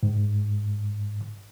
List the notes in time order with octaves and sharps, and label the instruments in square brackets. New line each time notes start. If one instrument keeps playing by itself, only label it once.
[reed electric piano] G#2